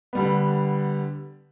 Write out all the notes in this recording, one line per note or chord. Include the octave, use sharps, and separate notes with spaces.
D3 G3 B3